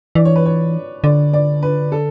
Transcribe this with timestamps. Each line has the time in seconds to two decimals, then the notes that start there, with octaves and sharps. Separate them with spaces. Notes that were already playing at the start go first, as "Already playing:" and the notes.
0.15 E3 D5
0.25 C#5
0.36 B4
0.45 C#5
1.04 D3 D5
1.33 D5
1.63 B4
1.92 A4